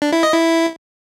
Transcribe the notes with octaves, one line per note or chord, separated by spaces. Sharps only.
D4
E4
D#5
E4